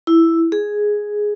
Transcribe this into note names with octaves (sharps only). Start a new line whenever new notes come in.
E4
G#4